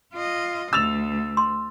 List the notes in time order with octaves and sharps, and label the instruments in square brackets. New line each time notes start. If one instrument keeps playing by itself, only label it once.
[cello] F4 D#5
[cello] D2 [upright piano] E6 A6 F7
[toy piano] C6